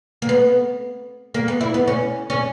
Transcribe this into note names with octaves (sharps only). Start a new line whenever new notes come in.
A#3
B3
A#3
B3
E4
B3
C#4
C#4